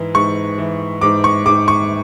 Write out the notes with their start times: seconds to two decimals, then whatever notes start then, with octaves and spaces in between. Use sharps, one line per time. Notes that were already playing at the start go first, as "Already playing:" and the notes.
Already playing: G#2 E3
0.14 G#2 C#6
0.58 E3
1.01 G#2 D6
1.24 C#6
1.46 G#2 D6
1.68 C#6